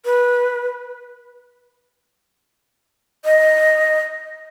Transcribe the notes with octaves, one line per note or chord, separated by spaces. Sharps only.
B4
D#5